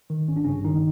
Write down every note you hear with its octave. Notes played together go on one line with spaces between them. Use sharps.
D#3
G#1 C#4
D4
G2 C#3 C#4
G#1 D#3 D#4